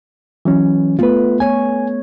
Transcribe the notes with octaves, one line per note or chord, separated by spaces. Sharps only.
E3 F#3 C#4
A3 B3 F4 B4
B3 C#5 G#5